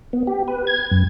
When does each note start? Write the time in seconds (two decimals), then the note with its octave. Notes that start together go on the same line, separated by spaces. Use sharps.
0.13 B3
0.27 G4
0.48 B4
0.67 G#6
0.91 F#2